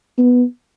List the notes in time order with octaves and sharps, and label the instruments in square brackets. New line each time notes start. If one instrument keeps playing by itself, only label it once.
[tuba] B3